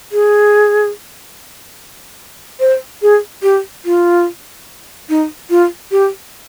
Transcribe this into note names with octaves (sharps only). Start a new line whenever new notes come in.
G#4
C5
G#4
G4
F4
D#4
F4
G4